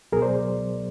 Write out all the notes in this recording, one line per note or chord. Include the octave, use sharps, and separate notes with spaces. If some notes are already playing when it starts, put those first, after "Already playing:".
C2 B2 F#3 B3 G#4 A#4
C5 D5